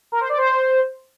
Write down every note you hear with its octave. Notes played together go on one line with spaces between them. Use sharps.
A#4
C5
D5
C5